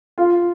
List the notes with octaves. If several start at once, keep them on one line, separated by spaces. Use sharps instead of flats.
F4